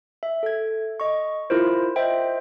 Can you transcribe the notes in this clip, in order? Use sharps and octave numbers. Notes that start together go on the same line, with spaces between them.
E5
A4 G#6
D#5 C#6
E4 F4 A#4 C5
C5 D#5 E5 G5